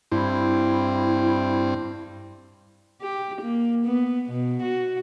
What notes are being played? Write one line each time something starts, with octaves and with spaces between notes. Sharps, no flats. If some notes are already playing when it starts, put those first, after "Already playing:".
G2 C4 E4
G4
A#3
B3
B2
F#4